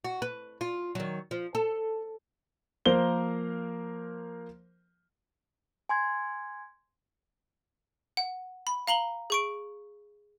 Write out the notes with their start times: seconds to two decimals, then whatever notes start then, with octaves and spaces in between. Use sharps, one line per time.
0.04 F#4
0.22 B4
0.61 F4
0.95 D#3 F#3
1.31 F3
1.55 A4
2.86 F3 A#3 A#4 C5 G7
5.89 G#5 C6 G#6
8.17 F#5
8.67 B5
8.87 F5 A#5 F#7 G7
9.30 G#4 C#6 D7